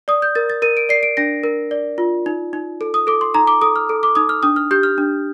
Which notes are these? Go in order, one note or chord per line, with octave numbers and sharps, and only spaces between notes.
D5 D#6
G6
A#4 A6
A6
A#4 D#7
D7
D5 C7
D7
D4 A#6
A#4
D5
F4
D#4
D#4
A4
D#6
A4 D6
C6
D#4 A#5
D6
A4 D#6
F6
A4
D6
D#4 D#6
F6
D4 D#6
F6
G4 G6
F6
D4